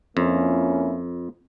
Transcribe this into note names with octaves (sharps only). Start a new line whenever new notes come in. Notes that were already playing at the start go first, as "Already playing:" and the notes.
F2 A#3 C#4 E4